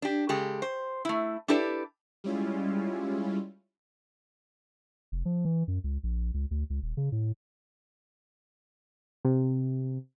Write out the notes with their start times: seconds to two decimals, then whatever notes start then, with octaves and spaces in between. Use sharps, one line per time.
0.02 D4 G4
0.29 C#3 G#3 G4 A4
0.62 C5
1.05 A3 E4
1.48 D4 E4 G4 A4 B4 D5
2.24 G3 G#3 C#4 E4 F4
5.12 F1
5.25 F3
5.45 E3
5.68 F#2
5.84 C#2
6.03 A#1
6.34 C#2
6.51 D2
6.70 C#2
6.82 D#1
6.97 C#3
7.12 A2
9.25 C3